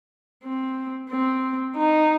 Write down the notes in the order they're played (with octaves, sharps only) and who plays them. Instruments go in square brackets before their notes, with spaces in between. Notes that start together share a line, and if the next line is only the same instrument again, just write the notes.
[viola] C4
C4
D#4